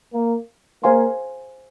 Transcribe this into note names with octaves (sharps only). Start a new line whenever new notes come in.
A#3
A#3 G#4 C5 F5 G#5 C6